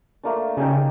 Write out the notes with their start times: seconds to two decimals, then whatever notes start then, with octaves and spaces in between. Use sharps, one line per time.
0.23 A3 A#3 D4
0.57 C#3 D#4 G4 G#4